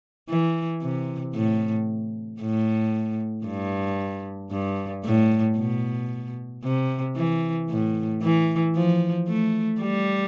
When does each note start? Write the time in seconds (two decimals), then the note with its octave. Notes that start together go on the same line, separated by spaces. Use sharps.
0.29 E3
0.82 C3
1.34 A2
2.41 A2
3.46 G2
4.51 G2
5.05 A2
5.57 B2
6.64 C3
7.16 E3
7.70 A2
8.22 E3
8.75 F3
9.27 A3
9.80 G3